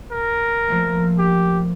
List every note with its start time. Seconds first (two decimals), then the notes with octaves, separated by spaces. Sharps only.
0.12 A#4
0.68 F3 A3 A#3
1.19 G4